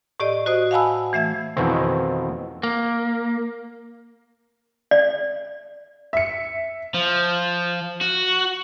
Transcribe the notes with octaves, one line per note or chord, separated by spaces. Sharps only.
A2 G4 D5 D#5
F#4 C5 D#5 D#6
F5 F#5 G#5 A5 B5 E6
E3 A3 E5 G#6
F2 B2 D#3 E3 C4
A#3
D5
E5 C#7
F3
F#4